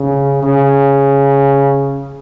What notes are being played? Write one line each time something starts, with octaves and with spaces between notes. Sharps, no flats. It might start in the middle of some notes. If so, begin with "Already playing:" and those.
Already playing: C#3
C#3